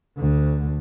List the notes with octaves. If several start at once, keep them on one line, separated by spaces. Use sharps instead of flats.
D2 D3